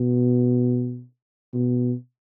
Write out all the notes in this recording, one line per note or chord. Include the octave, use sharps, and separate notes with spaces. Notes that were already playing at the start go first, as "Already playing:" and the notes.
Already playing: B2
B2